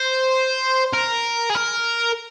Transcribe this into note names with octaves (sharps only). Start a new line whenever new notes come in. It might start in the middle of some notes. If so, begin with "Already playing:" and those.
Already playing: C5
A#4
G#4
A#4